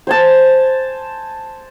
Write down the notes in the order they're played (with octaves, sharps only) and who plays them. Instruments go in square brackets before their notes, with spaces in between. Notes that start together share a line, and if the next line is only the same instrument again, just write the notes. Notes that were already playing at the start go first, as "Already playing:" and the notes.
[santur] C5 G#5 A5